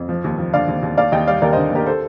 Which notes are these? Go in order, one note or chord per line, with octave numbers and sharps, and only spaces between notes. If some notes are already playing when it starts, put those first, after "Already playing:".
Already playing: F2
F3
D#2
F3
D3 D5 F5
D#2
D#2
D#2 D5 F5
D#2 D#5 G5
G3 D5 F5
D#2 A#4 D5
D3 C5 D#5
D#2 G4 A#4
A4 C5